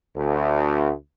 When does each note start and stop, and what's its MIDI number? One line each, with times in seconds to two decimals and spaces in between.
0.16 0.91 38